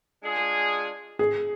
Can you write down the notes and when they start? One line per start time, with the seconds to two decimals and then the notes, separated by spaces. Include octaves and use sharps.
0.23 G#3 D4 F4 G#4
1.19 G#4